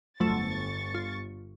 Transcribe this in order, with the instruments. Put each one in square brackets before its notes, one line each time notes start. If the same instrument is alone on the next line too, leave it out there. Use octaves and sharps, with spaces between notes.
[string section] G1 C#6 A6 [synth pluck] F2 F#3 A3
[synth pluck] F4